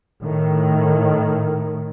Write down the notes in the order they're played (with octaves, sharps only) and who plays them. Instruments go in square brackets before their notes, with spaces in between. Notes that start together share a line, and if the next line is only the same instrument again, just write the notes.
[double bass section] A2 D#3